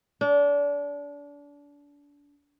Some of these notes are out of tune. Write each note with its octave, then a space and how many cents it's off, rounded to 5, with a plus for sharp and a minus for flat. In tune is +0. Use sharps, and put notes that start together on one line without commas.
D4 -30